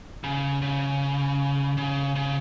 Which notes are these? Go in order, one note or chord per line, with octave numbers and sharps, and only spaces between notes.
C#3
C#3
C#3
C#3